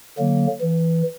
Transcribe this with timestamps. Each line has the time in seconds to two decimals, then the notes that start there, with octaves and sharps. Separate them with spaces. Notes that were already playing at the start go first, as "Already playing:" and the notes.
0.18 D3 F#3 A#3
0.61 E3